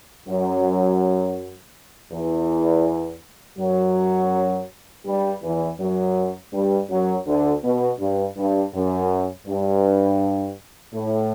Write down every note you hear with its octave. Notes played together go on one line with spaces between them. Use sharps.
F#2 F#3
E2 E3
F#2 F#3
G2 G3
E2 E3
F#2 F#3
G2 G3
F#2 F#3
D2 D3
B2
G2
G2
F#2
G2
A2